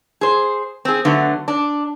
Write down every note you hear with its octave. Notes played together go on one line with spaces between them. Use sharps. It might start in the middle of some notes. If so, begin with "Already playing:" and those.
G#4 C5
C4 G#4
D3 F#3 A3 B3
D4